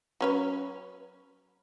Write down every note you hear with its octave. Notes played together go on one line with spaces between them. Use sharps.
F#3 C#4 B4